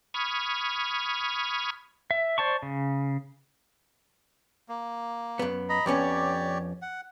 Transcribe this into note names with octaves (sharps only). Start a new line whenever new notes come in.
B5 C#6 D#6 F6 G#6
E5
C5 D5 A5 C#6
C#3
A#3
F#2 B3
D#5 A#5 B5
F2 B3 C#4 G4 C#5 D5
F#5